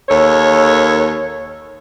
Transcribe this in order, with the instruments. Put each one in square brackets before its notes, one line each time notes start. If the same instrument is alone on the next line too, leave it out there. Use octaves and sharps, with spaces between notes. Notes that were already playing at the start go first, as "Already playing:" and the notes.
[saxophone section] D#2 A4 C#5